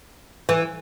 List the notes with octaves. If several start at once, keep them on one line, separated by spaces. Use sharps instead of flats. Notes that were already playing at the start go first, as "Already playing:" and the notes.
E3